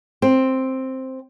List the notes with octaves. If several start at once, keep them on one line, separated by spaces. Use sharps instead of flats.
C4